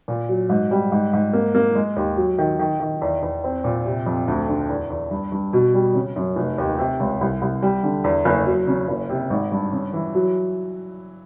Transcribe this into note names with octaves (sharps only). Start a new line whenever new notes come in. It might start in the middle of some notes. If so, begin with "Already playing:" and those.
A#2
F#3
G#2
G3
G#2
G#2
A#3
A#3
G#3
D#2
F#3
D#3
D#3
D#3
E2
E2
C4
A#2
C3
F2
D2
D3
E2
E2
G2
G2
B2
G3
C#3
F#2
F1
D#2
C3
C#2
C2
C2
G3
D3
E2
F#1
F#3
C#3
F#1
C3
G#1
G2
C#3
E3
F#3